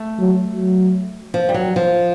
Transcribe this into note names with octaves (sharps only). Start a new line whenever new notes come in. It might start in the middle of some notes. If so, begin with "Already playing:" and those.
Already playing: A3
F#3
F#3
F3
G3
F#3
F3